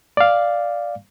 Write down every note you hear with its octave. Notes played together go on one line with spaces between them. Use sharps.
D5 F5